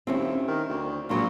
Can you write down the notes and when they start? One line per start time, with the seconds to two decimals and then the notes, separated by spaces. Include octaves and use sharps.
0.07 D#1 C4 C#4 E4
0.48 D#3
0.69 D2
1.09 A#1 A#2 F#3 A#3